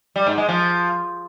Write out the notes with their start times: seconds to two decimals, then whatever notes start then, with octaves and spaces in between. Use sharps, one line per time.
0.16 G3
0.27 G#2
0.38 G#3
0.49 F3